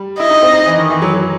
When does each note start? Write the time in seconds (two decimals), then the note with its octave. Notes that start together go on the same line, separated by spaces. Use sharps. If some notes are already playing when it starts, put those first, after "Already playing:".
Already playing: G3
0.19 E4 D#5
0.30 D#4
0.42 C4
0.53 D#4
0.66 E3
0.78 D#3
0.90 E3
1.02 F#3
1.14 F#3